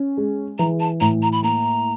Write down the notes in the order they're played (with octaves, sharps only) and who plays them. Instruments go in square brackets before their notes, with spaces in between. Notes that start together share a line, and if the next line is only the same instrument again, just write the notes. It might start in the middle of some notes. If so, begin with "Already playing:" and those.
Already playing: [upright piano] C#4
G#3
[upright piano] E3 [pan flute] A#5
[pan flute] A5
[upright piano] A2 [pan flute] A#5
[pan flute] A#5
B5
[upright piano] A#3 [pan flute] A#5